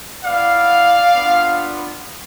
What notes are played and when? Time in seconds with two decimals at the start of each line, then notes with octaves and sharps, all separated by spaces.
0.25 B3 E4 D5 F5
1.16 B3 D4 F4